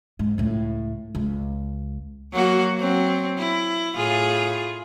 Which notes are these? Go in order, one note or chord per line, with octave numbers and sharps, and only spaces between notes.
G#2
C#2 A2
C#2
F#3 A#3 F#4
F#3 C4
E4
A2 F4 G#4